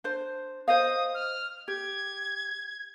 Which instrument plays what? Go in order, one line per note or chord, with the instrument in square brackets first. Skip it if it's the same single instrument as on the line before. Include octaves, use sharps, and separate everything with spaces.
[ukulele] D4 C5
[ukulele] C5 D#5 F5 [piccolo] D#6
[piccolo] F6
[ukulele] G4 [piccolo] G#6